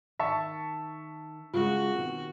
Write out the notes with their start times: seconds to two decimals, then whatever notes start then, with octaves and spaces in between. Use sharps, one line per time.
0.19 D#3 E5 A5 C#6
1.54 C#3 G#3 F4 F#4
1.95 B2 D#3 C4